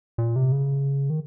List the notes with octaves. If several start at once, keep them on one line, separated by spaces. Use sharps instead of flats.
A#2
C3
C#3
D#3